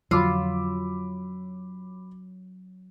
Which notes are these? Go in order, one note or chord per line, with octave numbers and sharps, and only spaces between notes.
F2 D3 F3 F#3 F4 B5 D6 E6